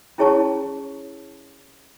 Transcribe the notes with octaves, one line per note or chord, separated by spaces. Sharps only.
C#4 E4 G#4 C#5 A5 C#6